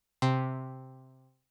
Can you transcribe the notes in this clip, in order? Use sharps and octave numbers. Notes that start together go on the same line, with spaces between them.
C3